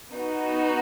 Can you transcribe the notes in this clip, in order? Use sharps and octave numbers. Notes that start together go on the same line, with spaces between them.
B3 D#4 F#4